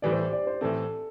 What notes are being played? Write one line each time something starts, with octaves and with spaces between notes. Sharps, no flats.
A2 E3 G3 D5
C5
G4
D5
C5
A2 E3 C4 A4